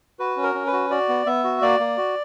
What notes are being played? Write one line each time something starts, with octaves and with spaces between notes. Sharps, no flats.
F#4 B4
C#4
A#4
C#4
B4
F#4
F#4 D5
B3
B3 E5
F#4
A#3 D5
A#3
F#4